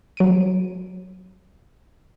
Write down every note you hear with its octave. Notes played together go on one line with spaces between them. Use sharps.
F#3 D7 D#7